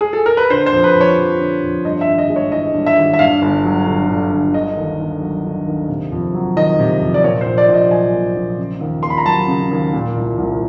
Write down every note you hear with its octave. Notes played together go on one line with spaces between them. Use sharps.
G#4
A4
A#4
B4
D3 C5
C5
F2
B4
F2
C#5
F3
D3
F2
G2 D#5
E5
G#1
D#5
G#3
C#5
E3 D#5
G2
E5
G#1
E5
G2 F5
G1
F#3
D3
G2
G1
D3 D#5
D#2
D#2
F#3
D3
D#2
C3
F2
F#3
D#3 D#5
C3
F2
D5
A#2 C#5
C5
A#1
D5
A#1
D#5
F#3 G#5
A#2
A#1
C#3
D#2
A#3 C6
B5
A#5
F#3 A5
C#3
D#2
A#2
C2
C2